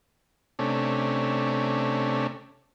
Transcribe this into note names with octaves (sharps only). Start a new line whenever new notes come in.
C3 A3 C#4 D4